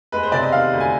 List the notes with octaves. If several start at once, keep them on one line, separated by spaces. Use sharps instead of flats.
G#3 B4
C5
C3 D5
D#5
D#3 F5
D2
G#5